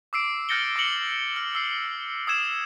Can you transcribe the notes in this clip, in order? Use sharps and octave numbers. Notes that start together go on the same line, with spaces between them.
D6 E6 C7 D7
F6 G6 A6 A#6 C#7 G7
D6 A#6 C#7 F#7 G7
F6
E6 C7
D#6 E6 G#6 E7